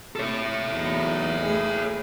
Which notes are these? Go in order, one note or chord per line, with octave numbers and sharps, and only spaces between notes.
C3 A4 C#5
E2 F#3 D#4
A3 A#3 G#4